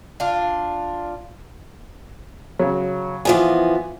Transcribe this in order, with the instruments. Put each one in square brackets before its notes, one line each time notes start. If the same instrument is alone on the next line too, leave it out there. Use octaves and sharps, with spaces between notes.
[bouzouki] D4 F4
[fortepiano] C#3 F#3
[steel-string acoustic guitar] E3 F3 B3 [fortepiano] G#5